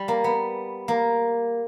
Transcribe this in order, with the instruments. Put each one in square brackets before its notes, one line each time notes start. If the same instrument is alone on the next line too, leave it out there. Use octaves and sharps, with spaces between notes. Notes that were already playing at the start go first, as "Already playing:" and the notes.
Already playing: [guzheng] G3
A#3
B3
A#3